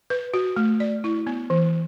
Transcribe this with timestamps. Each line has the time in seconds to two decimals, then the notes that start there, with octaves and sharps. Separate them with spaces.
0.10 B4
0.34 F#4
0.56 A3
0.80 D5
1.04 E4
1.27 B3
1.50 E3